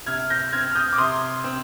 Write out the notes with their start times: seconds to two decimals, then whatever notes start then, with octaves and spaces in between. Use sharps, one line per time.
0.07 C3 F6 G#6
0.30 G6 A#6
0.53 C4 F6 G#6
0.71 F6
0.75 D#6 G6
0.93 D6
0.98 C3 C6 D#6
1.44 C4